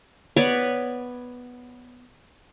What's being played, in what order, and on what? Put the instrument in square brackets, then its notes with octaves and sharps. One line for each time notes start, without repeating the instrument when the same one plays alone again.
[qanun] B3 B4 C#5 D5